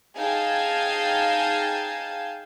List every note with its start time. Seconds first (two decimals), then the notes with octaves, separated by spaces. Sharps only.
0.17 D#4 G#4 F5 G5 A5 G#6